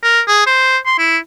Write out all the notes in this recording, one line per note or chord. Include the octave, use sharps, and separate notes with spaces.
A#4
G#4
C5
C6
E4